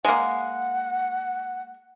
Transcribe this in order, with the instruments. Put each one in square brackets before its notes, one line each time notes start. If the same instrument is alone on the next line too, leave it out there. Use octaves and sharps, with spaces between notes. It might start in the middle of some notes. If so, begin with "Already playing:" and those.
[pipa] G#3 A#3 [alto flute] F#5